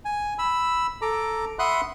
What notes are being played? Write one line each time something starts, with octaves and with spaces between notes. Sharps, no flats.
G#5
B5 E6
A4 A#5 D6
E5 F#5 B5 C6 D#6 F#6